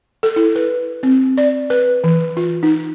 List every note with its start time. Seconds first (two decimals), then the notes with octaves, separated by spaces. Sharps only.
0.23 A4
0.36 E4
0.56 B4
1.03 C4
1.38 D5
1.70 B4
2.04 E3
2.37 F4
2.63 D#4